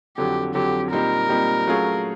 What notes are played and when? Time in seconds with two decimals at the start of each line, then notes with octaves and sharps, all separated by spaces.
0.17 F2 D3 F#3 G4
0.54 F2 D3 F#3 G4
0.92 A#2 G3 C4 D#4 G4 A#4
1.29 A#2 G3 C4 D#4 G4
1.67 F#3 A3 C#4 F4 G#4